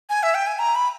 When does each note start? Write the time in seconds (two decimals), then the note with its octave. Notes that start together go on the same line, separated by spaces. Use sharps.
0.10 G#5
0.23 E5
0.34 G5
0.47 G#5
0.59 A#5
0.75 B5